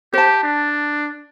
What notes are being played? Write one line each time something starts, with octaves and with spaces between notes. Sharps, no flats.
G4 C5 A5
D4